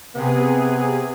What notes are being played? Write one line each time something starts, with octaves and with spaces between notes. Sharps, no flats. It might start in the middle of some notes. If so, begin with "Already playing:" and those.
C3 B3 G#4